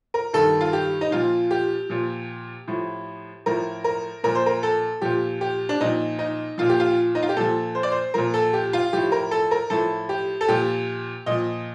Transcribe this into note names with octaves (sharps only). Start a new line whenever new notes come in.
A#4
G2 D#3 A4
F4
G4
D#4
A#2 F3 F4
G4
A#2 F3
A2 F3
A2 F3 A#4
A#4
A#2 F3 A#4
C5
A#4
A4
A#2 F3 G4
G4
D4
A#2 F3 D#4
D#4
A#2 F3 F4
G4
F4
D#4
F4
G4
A#2 F3 A4
C5
D5
C5
A#2 F3 A#4
A4
G4
F4
A2 F3 G4
A#4
A4
A#4
A2 F3 A4
G4
A4
A#2 F3 G4
A#2 F3 D#5